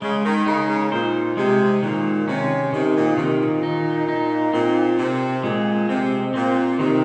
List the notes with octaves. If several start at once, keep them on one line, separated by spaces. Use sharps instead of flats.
C#3 G#3
D#3
C#3 D#4
C#3
A#2 C5
C3 G#3
A#2 D#3
C3 C#4
C3 D#3
A#2
C3 D#3
A#2
D#4
D#4
A#2 C4
C3 C4
A#2 G#3
C3 C4
A#2 C4
C3 D#3